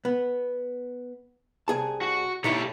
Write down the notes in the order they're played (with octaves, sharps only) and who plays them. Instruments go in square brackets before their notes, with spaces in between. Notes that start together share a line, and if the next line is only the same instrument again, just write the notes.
[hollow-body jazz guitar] B3
C2 G#4 A5
[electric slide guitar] F#4
[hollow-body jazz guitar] B1 D#4 E4 [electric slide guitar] G4 A4 C#5